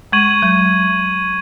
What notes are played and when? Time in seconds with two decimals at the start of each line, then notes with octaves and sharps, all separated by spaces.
0.12 G#3 C#6 G#6 D#7 F#7
0.42 F#3